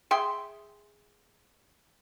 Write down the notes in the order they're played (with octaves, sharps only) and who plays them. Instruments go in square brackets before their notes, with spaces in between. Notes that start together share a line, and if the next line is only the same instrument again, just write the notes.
[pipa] G#4 E5 G5 C6